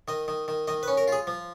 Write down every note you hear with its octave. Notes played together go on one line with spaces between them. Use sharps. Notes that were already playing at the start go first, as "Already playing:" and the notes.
D#3 D#5
D#3
D#3
D#3 D#5
B4
C#4
A#4
F4 G#4
F3